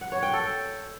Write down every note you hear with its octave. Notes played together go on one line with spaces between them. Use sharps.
F#5
C#5
G5
A4